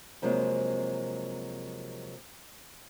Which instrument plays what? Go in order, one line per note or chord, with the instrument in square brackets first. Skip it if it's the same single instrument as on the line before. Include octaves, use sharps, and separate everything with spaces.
[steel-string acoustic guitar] F2 C3 F#3 G#3 A#3